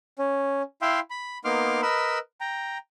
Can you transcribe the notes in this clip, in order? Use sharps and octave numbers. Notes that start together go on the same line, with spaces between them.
C#4
E4 E5 F5 G5 C6
B5
A#3 B3 D#4 C6 D6 F6
A#4 B4 D#5 B5 E6
G5 A#5